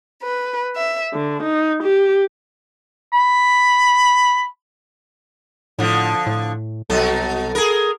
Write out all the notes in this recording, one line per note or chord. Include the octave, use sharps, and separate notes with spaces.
B4
E5
D3
D#4
G4
B5
A2 D3 F3
A2
C2 B2 F#3 A4
G#4 A#4